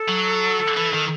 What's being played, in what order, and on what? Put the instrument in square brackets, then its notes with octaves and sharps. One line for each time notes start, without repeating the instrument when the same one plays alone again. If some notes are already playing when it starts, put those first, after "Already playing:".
Already playing: [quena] A4
[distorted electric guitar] F#3
E3
D#3